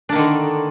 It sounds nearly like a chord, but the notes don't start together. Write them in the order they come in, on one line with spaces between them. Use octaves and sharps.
D4 A#3 D#3 D3